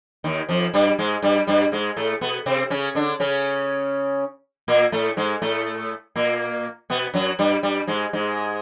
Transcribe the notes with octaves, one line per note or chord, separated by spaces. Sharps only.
D#2 D#3
F2 F3
G2 G3
G#2 G#3
G2 G3
G2 G3
G#2 G#3
A2 A3
B2 B3
C3 C4
C#3 C#4
D3 D4
C#3 C#4
A#2 A#3
A2 A3
G#2 G#3
A2 A3
A#2 A#3
B2 B3
F#2 F#3
G2 G3
G2 G3
G#2 G#3
G#2 G#3